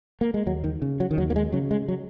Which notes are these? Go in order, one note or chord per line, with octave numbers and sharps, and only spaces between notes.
A#3
G#3
D#2 F#3
D#3
C#3
F#3
D#3
D#2 F#3
A#3
G#3
C#3 F#3
G#3
F#3